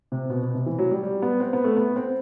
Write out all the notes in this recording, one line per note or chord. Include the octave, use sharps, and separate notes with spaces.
C3
B2
B2
C3
E3
F#3
G3
G3
B3
C4
B3
A3
B3
C4